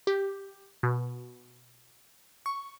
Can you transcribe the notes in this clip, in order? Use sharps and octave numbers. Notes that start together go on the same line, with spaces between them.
G4
B2
C#6